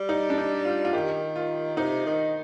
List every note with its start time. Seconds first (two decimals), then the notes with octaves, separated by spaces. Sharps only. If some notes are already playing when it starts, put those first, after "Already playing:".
Already playing: G3
0.09 D#4
0.30 D4
0.38 D#4
0.65 F4
0.85 F4
0.93 D#3 G4
1.36 F4
1.77 C3 D#4
2.06 D#3